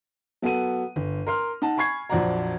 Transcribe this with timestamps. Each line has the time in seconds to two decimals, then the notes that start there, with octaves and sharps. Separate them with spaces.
0.42 F#3 B3 A4 F#5 D#7
0.96 G1
1.26 A#4 C6 F6
1.62 D#4 F#5 A5
1.77 G#5 B5 C#6 G#6 C7
2.10 A#1 F2 F#3 D5 F#5 A#5